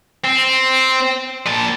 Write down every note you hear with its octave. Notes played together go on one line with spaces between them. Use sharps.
C4
A#2 A5